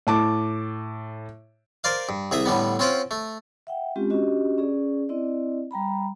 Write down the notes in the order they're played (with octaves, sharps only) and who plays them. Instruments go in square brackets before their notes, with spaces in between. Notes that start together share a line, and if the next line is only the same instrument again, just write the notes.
[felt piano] A2 A5 D6
[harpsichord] A#4 C5 D5 F5
G2
C2 G#4 E5 D#6
A2 D3 G3 B3
C4 C#4 F4 C5 F#5 G5
A3
[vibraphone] E5 F#5 G5
G#3 C4 C#4 F4 G4
C#4 D4 F#4 G4 D#5
C#4 G#4 D5
C4 E4 D5 D#5
G3 G5 A#5 B5